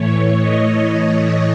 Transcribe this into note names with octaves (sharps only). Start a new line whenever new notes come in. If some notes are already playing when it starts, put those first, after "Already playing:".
Already playing: A2 E3 A3 C#5
D#5